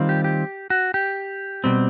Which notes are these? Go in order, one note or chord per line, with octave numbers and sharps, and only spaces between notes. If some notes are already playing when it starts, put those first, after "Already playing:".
Already playing: D#3 G3 C4 F4
G4
G4
F#4
G4
B2 G3 C4